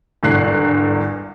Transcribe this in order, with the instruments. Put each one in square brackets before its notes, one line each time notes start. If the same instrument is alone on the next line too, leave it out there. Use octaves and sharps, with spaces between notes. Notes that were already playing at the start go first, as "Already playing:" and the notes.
[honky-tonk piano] G#1 E2 G2 D3 F#6 C7